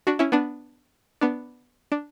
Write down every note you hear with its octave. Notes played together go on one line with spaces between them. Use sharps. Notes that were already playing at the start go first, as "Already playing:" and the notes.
D4 F#4
C#4 E4
B3 D4
B3 D4
D4